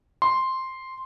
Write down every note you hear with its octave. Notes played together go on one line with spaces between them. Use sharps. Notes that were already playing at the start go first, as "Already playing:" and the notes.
C6